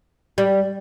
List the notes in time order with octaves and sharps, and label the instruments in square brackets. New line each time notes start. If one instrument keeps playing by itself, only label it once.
[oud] G3